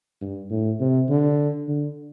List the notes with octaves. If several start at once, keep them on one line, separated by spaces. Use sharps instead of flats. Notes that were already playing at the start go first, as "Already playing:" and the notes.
G2
A2
C3
D3
D3